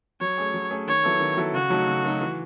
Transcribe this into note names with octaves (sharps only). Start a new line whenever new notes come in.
F#3 C#5
A3 C#4 G#4
F#3
A3 C#4 G#4
D#3 C#5
F#3 B3 E4 A4
D#3
F#3 B3 E4 A4
C#3 F#4
F#3 A3 D#4 A4
C#3
F#3 A3 D#4 A4
E3